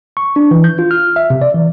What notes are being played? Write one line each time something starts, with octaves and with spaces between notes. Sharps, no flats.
C#6
D4
E3
G6
F4
F6
E5
C3
D5
E3